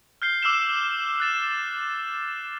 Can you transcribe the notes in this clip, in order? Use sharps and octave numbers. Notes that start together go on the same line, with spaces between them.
F6 G6 C7 G7
D6 E6 F6 C7 E7 G7
F#6 A6 E7